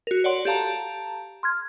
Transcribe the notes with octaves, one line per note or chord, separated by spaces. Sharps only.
F#4 A#4
C#5 D5 F#5 C6
G4 A4 F5 A5 A#5
C6 F6 G#6